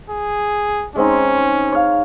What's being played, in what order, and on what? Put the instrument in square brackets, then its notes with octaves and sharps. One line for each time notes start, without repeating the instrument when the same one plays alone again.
[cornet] G#4
[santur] G#3 C4 D#4 [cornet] C#4
[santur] C#5 F5